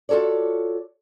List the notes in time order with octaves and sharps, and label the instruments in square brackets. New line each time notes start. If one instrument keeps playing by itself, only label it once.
[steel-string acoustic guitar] F4 F#4 A4 C#5 D5